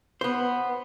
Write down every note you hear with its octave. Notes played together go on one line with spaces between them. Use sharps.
B3 C5